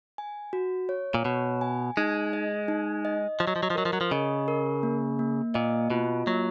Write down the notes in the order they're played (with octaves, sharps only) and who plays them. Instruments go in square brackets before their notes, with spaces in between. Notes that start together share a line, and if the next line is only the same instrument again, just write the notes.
[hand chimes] G#5
F#4
C#5
[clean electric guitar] A#2
[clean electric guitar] B2 [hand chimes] C#5
[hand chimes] G#5
[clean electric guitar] G#3 [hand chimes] D#4
[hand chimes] D#5
D#4
D#5
[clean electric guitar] F3 [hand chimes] D#5
[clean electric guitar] F#3
F3
F#3
F3
[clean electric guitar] F#3 [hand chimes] A#4
[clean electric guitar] F3
F#3
F3
[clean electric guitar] C#3 [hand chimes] D#5
[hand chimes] A#4
A#3
A#3
[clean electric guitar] A#2 [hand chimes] D#5
[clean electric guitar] B2 [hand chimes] F4
[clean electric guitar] F#3 [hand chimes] A#3